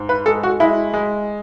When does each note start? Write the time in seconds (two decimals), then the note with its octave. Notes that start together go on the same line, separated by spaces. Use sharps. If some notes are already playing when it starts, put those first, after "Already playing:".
Already playing: G#2
0.09 B4
0.26 G#3 A4
0.43 F#4
0.60 G#3 E4
0.94 G#3